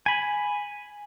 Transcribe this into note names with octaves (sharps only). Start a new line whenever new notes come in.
G#5 B5